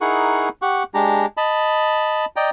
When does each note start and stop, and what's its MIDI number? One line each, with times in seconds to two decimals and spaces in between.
0.01 0.49 63
0.01 0.49 64
0.01 0.49 68
0.01 0.49 70
0.01 0.49 78
0.01 0.49 85
0.62 0.83 67
0.62 0.83 78
0.62 0.83 85
0.94 1.26 56
0.94 1.26 62
0.94 1.26 67
0.94 1.26 82
1.37 2.25 75
1.37 2.25 81
1.37 2.25 83
2.36 2.50 74
2.36 2.50 75
2.36 2.50 79
2.36 2.50 82